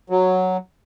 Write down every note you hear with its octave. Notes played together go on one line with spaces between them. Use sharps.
F#3